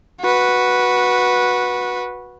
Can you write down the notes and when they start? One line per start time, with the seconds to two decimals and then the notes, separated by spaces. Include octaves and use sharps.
0.21 F#4 B4